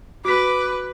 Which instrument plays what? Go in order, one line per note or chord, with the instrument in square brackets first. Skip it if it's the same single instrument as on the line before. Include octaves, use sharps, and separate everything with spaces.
[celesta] F#4 B6 [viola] B4 [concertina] D6